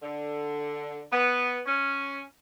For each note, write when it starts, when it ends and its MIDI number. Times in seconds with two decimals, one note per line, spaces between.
0.03 1.03 50
1.13 1.59 59
1.66 2.22 61